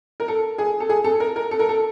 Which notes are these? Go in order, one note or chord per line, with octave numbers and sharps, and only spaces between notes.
A#4
A4
G#4
A4
G#4
A4
A#4
A#4
A4
A#4
A4